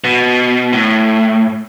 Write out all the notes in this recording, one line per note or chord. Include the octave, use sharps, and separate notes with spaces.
B2
A2